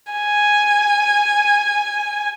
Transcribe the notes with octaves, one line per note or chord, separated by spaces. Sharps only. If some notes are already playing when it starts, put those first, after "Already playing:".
G#5